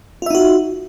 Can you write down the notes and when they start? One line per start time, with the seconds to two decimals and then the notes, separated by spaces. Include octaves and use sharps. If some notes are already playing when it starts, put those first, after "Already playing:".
0.22 F4
0.26 E5
0.30 D#4
0.35 F#4